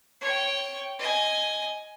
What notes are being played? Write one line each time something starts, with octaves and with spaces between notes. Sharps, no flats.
C#5 G5
D#5 G#5